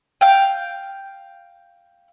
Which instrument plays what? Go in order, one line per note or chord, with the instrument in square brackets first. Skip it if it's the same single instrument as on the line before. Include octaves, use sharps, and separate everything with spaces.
[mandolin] F5 G5